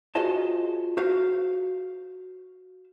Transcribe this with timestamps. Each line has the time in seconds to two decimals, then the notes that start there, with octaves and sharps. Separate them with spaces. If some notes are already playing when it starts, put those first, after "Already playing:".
0.15 F4 F#4 G#4 C5 D#5 A5
0.97 F#4 C5 F5